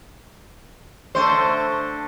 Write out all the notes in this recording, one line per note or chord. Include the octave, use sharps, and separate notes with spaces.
D3 A3 C5